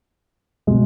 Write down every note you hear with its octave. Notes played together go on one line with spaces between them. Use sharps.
B2 G#3